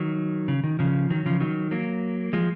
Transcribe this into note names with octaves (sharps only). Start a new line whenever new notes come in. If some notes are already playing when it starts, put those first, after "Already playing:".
Already playing: D#3 F#3
C#3
D#3
C#3 F3
D#3 F#3
C#3 F3
D#3 F#3
F#3 A#3
F3 G#3